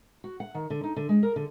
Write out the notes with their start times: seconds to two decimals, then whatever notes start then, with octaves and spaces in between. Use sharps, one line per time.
0.24 F#4
0.40 F#5
0.55 D#3
0.70 D3
0.84 D#4
0.96 D3
1.09 G#3
1.23 A#4
1.36 D3